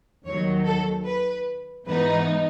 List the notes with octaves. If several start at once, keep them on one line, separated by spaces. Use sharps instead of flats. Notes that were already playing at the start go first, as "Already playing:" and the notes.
D#2 D#3 F#3 C#5
A4
B4
G#2 E3 B3 D#4 B4